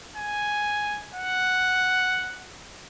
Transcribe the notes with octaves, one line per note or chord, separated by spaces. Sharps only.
G#5
F#5